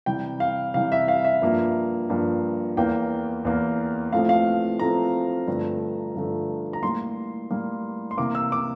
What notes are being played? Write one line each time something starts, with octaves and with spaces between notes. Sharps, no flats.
C3 E3 G3 G5
F5
C3 E3 G3 F5
E5
F5
E5
G2 F3 A#3
G2 F3 A#3
E2 E3 A#3 G5
E2 E3 A#3
A2 F3 A3 C4 F5
F5
A2 F3 A3 C4 A#5
G2 D3 F3 A3
G2 D3 F3 A3
A#5
A2 G3 A#3 C6
A2 G3 A#3
C6
C3 E3 A#3 D6
E6
D6